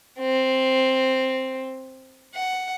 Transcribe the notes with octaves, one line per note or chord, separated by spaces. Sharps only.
C4
F#5